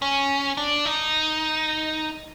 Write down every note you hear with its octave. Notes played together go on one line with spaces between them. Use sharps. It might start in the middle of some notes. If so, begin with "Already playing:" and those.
C#4
D4
D#4